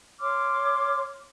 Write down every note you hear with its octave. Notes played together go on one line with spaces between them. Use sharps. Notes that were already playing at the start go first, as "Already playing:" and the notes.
C#5 C6 D6 F6